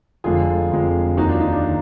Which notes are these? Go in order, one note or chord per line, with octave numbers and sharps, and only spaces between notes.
F1 F2 D3 F3 G#3 F4 G#4
F1 F2 D3 F3 G#3
D#2 D#3 F#3 A#3 D#4 F#4
D4 F4
D#4
D4
D#3 F#3 A#3